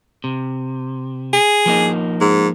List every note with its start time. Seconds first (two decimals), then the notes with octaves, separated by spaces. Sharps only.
0.24 C3
1.33 G#4
1.66 F3 A#3 D#4
2.21 G#2